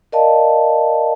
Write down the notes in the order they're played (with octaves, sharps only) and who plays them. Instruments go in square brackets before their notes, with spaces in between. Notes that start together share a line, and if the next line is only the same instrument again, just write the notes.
[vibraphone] A#4 D5 D#5 F5 A5